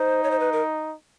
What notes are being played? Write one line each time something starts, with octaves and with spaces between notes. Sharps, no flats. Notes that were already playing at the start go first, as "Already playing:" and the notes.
Already playing: D#4 C5
C#5
C5
B4
A#4